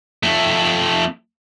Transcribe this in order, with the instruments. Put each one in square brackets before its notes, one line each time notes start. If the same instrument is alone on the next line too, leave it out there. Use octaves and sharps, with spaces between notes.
[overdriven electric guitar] F2 A3